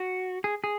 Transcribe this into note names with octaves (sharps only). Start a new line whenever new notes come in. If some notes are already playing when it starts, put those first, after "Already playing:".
Already playing: F#4
G#4
G#4